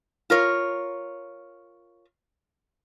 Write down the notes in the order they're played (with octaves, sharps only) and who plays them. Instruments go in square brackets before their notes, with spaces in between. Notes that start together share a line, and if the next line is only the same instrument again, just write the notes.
[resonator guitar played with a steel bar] F4 A#4 C#5